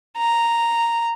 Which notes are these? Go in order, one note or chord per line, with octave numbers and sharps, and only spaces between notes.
A#5